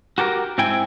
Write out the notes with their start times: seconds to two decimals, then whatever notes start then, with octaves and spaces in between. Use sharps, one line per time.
0.18 F#4 G4 A4 A#4
0.58 G#2 C4 E4 G5 G#5